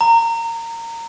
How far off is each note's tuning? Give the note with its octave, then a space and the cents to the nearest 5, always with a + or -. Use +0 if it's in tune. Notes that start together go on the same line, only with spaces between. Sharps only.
A#5 -20